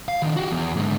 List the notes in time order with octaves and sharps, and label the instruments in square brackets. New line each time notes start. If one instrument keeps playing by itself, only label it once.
[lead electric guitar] F5
D#3 D4
F#4 G4
E2
G#2 D3